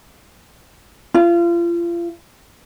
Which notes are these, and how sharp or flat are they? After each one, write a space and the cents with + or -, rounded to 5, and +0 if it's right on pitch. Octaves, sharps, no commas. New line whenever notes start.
F4 -35